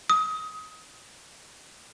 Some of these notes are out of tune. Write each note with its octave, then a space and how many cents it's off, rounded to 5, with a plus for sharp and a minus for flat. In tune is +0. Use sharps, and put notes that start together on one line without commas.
D#6 +25